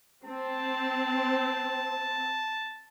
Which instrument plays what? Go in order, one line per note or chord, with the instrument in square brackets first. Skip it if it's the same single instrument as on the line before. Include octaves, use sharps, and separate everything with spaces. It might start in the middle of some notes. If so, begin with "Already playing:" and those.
[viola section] C4 [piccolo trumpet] A5